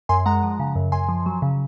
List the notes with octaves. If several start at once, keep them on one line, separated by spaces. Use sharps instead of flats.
F#2 G#5 C6
G#3 F#5 A#5
F3
C#3
F#2
F#2 G#5 C6
F3
F#3
C#3